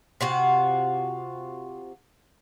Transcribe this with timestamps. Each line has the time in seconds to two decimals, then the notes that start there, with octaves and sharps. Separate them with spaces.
0.21 C3 F4 F#4